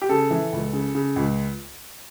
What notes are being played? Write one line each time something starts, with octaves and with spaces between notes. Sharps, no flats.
G4
C#3 A4
E3
C#2
C#3
C#3
C#2